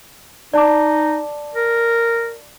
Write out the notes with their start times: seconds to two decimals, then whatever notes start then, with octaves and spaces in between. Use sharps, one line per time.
0.54 D#4 D5 A5 D6
1.55 A#4